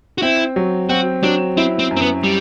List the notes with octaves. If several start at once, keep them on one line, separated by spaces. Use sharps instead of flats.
F#4
C4 E4
F#3
C4 F#4
F#3 D4
C4 E4
C4
F#2
C4
B3
G3